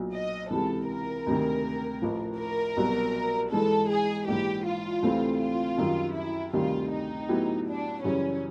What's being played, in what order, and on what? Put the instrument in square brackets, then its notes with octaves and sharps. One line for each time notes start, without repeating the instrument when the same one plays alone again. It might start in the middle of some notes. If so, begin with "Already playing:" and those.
Already playing: [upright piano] B1 A#2 F#3
[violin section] D#5
[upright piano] C#2 C3 E3 [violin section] A4
[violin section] A#4
[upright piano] D2 C3 D#3
A1 A2 F3
[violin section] A#4
[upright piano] C2 B2 F#3 B3
[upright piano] G#2 E3 G#3 [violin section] A4
[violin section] G#4
[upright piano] A#1 G#2 E3 [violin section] G4
[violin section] F4
[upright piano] D2 C3 E3 A3 C4
[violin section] F4
[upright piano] F#2 D#3 G3
[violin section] E4
[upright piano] D2 C3 D#3 G3 [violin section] F4
[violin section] D#4
[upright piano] A2 F#3 B3 E4 G4
[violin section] D4
[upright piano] F#2 C#3 E3 G3 [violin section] C#4